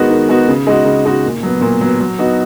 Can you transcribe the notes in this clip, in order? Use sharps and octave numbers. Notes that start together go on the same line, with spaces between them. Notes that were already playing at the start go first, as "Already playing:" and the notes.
Already playing: D#3 G#3 B3 D#4 F#4
D#3
G#3 B3 D#4 F#4
C#3
G#3 D#4 F#4
C#3
G#3 D#4 F#4
A#2
F#3 B3
A#2
F#3 B3
F#3
B3 D#4 F#4